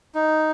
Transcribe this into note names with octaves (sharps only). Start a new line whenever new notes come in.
D#4